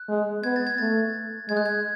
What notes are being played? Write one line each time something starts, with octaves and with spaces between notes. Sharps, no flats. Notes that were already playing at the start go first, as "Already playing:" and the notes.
Already playing: F#6
G#3
B3 G#6
A6
G#6
A3 A6
G#3 G#6
F#6
G#6